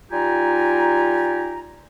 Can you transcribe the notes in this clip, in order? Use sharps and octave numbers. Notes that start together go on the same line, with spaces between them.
G3 D#4 F4 G4 G#5 A#5